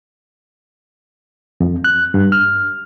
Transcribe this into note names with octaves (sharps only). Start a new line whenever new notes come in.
F2
F#6
G2
F6